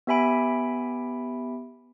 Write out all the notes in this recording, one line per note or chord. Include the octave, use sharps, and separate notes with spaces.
B3 G4 E5 G#5 B5 D7